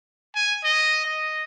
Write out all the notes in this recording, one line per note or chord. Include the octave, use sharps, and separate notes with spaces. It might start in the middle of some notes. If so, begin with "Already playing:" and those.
G#5
D#5
D#5